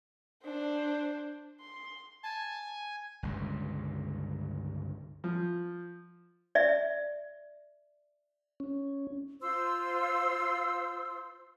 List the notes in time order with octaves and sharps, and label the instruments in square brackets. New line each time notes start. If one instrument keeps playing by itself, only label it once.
[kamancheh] D4 C5
C6
[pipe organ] G#5 [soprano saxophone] A5
[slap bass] G1 C#2 G2
[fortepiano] F3
[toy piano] D5 E5
[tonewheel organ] C#4
[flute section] F4 C5 C6 E6